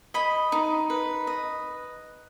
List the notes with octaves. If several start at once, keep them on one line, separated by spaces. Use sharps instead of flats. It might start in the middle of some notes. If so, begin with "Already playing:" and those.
D#5 B5
D#4
B4
D#5